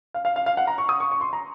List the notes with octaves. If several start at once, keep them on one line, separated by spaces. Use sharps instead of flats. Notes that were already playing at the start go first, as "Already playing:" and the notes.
F5
F5
F5
F5
F#5
A#5
C#6
D#6
C#6
C#6
C6
A#5